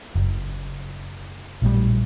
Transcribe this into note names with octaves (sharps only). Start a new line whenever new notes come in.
F#1
A#1 A2 G3